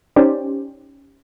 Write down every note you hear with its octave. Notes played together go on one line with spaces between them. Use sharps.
C#4 D#4 G4 C5 D5